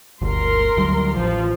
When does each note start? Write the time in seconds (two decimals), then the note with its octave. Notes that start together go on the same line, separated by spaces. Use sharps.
0.22 G1 D2 A#4 C6
0.77 D2 F#3 G3
1.15 A1 F3